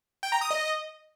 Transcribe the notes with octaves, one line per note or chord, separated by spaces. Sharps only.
G5
A#5
D#6
D#5